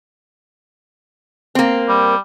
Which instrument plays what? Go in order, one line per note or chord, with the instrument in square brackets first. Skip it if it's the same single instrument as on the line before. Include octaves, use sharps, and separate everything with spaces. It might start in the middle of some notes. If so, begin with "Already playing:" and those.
[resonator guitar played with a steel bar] A#3 C4
[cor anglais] G3